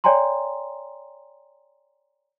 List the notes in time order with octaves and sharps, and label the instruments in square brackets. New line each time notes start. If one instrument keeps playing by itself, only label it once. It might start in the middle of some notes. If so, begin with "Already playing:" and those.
[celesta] C#5 D5 G5 G#5 A#5 C6